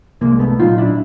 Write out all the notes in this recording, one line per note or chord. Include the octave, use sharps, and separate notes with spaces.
C2 G#3 A#3
A3 B3
A#2 F#3 D#4 F4
D4 E4